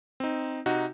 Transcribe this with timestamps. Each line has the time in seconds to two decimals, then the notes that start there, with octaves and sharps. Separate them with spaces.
0.20 C4 D#4
0.66 C3 D#4 F#4